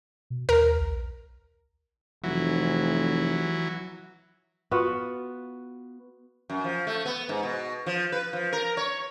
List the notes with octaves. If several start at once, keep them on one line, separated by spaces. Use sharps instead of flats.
B2
D#2 A#4
B1
F1 E3 F#3
B3 F4 F#4
F#2
F3
A3
B3
G#2
B2
F3
B4
F3
A#4
C#5